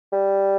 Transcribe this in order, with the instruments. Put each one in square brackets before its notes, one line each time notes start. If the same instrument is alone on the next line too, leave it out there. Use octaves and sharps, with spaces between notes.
[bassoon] G3